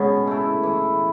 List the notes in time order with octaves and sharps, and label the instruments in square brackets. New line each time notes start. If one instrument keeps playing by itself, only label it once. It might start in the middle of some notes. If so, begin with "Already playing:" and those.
Already playing: [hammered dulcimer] B2 C#4 G#4 [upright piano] G#3
[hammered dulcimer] A3 E4
E3